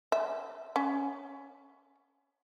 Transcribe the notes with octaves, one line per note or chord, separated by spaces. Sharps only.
E5
C#4